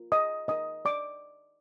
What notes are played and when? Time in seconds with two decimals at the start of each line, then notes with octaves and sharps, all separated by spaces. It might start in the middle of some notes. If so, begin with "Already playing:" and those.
Already playing: F4 A#4
0.12 D#5 D#6
0.48 D#4 A#4 D#5 D#6
0.85 D5 D6